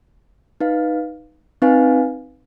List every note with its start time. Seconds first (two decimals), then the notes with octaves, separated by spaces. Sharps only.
0.61 D#4 B4 F5
1.62 C4 D#4 B4 F5 G#5